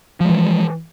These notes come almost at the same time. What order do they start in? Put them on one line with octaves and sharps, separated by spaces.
F3 G#3 E3